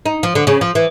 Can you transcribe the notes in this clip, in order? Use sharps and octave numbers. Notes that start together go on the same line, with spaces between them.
D#4
F3
D3
C#3
F3
E3